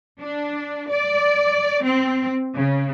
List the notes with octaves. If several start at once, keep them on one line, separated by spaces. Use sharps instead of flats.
D4
D5
C4
C#3